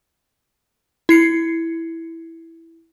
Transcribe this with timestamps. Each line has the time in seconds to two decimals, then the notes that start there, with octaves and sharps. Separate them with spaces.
1.09 E4 C7 C#7